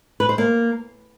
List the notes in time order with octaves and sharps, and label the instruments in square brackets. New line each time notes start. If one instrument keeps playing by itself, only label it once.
[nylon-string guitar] B4
C5
A#3